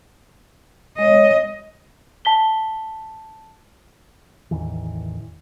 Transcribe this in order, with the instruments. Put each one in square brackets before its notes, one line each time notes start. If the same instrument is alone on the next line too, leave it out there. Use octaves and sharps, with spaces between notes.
[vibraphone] G#3 C#5 [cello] D#5
[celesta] A5 B6 G7
[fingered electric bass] A1 E2 D#3 E3